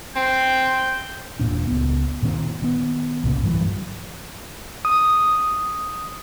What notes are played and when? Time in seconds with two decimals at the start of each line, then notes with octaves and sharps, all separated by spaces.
0.16 C4 G6
1.40 E1 A#2 D4
1.67 C#2 B3
2.22 A#2 D#3 C4
2.62 D#3 B3
3.24 C2 A#2 C#3
3.43 G2 E3 F#3
4.85 D#6